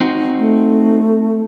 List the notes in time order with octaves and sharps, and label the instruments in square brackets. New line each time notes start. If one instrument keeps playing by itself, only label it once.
[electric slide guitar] C4 D#4 F#4
[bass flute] A3